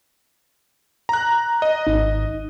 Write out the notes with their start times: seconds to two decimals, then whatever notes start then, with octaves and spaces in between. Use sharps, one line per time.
1.09 A#5 F#6
1.62 D#5
1.87 G#1 D#4